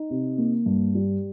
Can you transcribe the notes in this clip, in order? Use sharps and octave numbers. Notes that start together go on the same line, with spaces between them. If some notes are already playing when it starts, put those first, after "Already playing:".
Already playing: D#4
C3
A#3
G2
G3